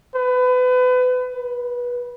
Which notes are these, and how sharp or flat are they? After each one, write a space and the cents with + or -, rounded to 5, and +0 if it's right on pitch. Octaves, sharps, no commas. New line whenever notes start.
B4 +30
B4 -25